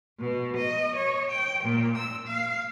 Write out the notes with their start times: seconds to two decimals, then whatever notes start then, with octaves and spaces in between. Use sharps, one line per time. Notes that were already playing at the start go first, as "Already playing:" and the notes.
0.19 B2
0.58 D#5
0.97 C#5
1.31 G5
1.64 A#2
1.97 E6
2.27 F5